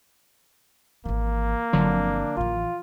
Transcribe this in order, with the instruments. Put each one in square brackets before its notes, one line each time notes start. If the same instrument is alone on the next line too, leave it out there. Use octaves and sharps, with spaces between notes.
[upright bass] G#1 E3 [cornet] A#3
[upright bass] G1 C4 [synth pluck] D3 F3 F#3 [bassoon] D4
[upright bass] A1 E3 [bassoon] F4